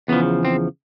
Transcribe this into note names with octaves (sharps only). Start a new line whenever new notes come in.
E2 C#3 F3 B3
C4